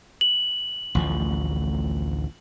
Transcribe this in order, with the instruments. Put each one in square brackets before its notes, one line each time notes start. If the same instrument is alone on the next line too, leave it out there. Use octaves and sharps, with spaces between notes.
[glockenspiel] F#7
[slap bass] A1 D2 F3